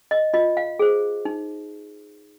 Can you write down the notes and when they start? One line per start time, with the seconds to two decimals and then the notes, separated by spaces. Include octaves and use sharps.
0.11 D#5
0.34 F4 D#5
0.57 F5
0.79 G#4 C5
1.25 D#4